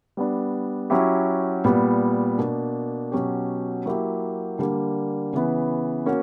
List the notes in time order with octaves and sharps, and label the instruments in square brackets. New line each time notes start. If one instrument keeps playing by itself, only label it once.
[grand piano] G3 B3 D4
F#3 C#4 E4 G4
A#2 G3 B3
B2 A#3 D4
B2 F#3 C#4 G4
F#3 A#3 E4 G4
D3 G3 A#3
C#3 E3 B3
A#3 C#4 F#4